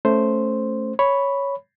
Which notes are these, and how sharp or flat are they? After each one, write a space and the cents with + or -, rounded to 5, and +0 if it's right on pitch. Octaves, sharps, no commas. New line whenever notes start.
A3 +0 C#4 +0 C5 +0
C#5 +5 B5 +0